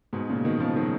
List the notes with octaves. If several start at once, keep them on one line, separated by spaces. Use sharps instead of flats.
G#2 B2
A#2 C#3
B2 D#3
C#3 F3
D#3 F#3